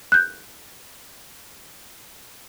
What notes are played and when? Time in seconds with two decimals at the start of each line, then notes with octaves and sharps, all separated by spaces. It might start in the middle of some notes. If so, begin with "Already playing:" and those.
0.12 F#6 G6